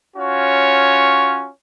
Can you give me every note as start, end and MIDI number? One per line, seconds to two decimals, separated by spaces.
0.17 1.49 61
0.17 1.49 65
0.17 1.49 66
0.17 1.49 73